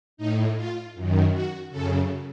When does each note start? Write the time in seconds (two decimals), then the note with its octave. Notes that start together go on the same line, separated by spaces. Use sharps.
0.17 A2 D#4
0.56 F4
0.95 F#2 D#3
1.32 F#4
1.70 F#2 C#3 A4